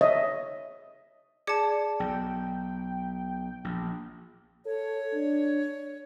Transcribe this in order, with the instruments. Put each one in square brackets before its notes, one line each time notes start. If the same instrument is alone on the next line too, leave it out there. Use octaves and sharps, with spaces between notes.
[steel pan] C#5 D#5 E5
[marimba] G#4 D6 [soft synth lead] D5 [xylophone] A5 C#7
[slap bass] B1 [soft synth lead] G5
[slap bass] A#1
[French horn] A4 [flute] C#5
[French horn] D4